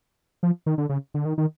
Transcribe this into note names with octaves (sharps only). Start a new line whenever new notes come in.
F3
D#3
D3
C#3
D3
D#3
D#3